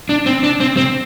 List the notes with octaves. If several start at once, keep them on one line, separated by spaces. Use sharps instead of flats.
D4
C4
D4
C4
C4